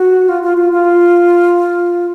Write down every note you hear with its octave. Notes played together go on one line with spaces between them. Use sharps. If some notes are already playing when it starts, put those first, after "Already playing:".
Already playing: F#4
F4
F4
F4
F4